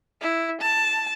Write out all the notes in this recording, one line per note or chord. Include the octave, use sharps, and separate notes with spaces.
E4
A5